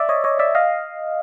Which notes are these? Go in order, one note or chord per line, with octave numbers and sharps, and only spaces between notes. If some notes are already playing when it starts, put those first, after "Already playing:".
Already playing: D5 E5
C#5 D#5
C#5 D#5
D5 E5
D#5 F5